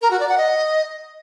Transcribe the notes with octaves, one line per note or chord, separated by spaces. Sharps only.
A#4
F#4
D5
F#5
D#5